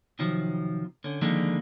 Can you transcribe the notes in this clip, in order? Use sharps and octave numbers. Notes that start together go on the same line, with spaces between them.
C3 D#3 F3 F#3
D3 C#4
D3 D#3 F3 G3 G#3 A#3